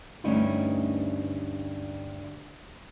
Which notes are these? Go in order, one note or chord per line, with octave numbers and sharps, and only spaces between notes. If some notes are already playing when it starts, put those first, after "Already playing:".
D2 G2 C#4 D#4 E4 B4